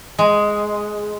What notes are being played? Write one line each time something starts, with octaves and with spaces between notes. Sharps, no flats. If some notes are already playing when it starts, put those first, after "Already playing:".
G#3